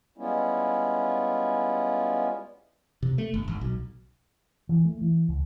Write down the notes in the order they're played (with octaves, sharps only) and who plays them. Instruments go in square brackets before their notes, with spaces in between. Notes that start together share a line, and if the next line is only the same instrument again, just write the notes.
[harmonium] G3 G#3 B3 C#4 E4 F4
[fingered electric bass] C3
A3
G1
G#1
B1
E3
A3
E3
C#2